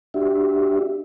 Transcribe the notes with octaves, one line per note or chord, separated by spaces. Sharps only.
D4 F#4 G4 E5